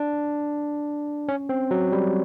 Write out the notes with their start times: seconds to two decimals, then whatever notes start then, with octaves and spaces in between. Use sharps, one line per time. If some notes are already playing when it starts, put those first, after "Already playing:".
Already playing: D4
1.29 C#4
1.49 C4
1.71 F#3
1.92 G3